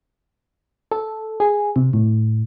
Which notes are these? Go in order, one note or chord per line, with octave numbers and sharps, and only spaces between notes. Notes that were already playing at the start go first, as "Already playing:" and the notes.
A4
G#4
C3
A2